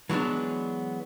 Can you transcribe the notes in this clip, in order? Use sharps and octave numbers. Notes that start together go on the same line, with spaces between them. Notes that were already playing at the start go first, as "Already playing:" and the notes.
E3 F#3 G#3 B3 D4